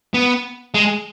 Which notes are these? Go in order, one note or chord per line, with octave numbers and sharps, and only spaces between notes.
B3
G#3